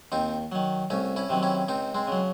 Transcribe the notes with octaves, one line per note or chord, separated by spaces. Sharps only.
D#2 C4 D#4
D#3 F#3
C2 A3 C#4
C#4 E4
C3 D#3 F#3
C#4 E4
C#2 C4 D#4
G#3 C4
C#3 F#3